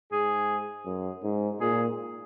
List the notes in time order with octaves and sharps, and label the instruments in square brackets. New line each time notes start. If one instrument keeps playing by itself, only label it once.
[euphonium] G#2 [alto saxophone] G#4
[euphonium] F#2
G#2
[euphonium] A#2 [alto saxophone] G#4